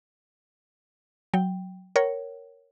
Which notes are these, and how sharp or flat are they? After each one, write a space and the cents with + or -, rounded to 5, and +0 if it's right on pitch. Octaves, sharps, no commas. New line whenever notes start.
F#3 +0 G5 +0
A#4 +0 C#5 +0 F#5 +45